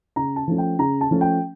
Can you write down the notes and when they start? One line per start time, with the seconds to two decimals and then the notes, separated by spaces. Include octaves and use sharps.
0.16 C#3 A#5
0.36 A5
0.48 F3 A3 C#4
0.58 G5
0.79 C#3 A#5
1.01 A5
1.11 F3 A3 C#4
1.21 G5